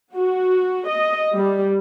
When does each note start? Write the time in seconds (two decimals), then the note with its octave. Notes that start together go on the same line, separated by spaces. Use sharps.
0.16 F#4
0.89 D#5
1.34 G3